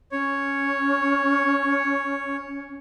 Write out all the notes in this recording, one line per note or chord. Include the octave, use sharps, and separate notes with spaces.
C#4 C#5